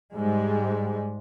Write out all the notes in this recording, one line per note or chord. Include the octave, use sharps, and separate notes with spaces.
G#2 G3 G#3